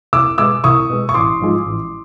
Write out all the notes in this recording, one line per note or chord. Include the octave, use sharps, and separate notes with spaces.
C2 D6 E6
B2 G#3 D6 E6
C2 C#6 D#6
B2 G#3
C#6
A1 C6 D6
G#2 F3 G#3
A1